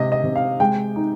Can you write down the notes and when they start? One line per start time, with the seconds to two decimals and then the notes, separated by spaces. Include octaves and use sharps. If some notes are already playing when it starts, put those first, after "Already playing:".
Already playing: C3 G#3 D#5
0.12 D#5
0.23 C3
0.36 F5
0.60 G#3 G5
0.96 D#4